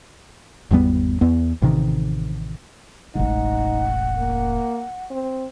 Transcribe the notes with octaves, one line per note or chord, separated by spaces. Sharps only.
G#1 E2 G3 B3
E2 B3
A1 C3 D#3
E1 A1 D#4 F#5
A#3
C4